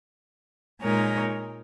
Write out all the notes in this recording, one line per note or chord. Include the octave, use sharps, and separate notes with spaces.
A#2 G#3 D#4 A#4 C#5